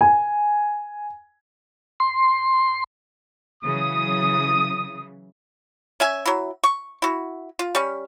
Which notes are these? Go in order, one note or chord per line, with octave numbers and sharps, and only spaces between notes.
G#5
C6
C#3 E3 F#3 D#6
C#4 E5 G#5
F#3 E4
C#6
E4 F#4
F4
G3 C#4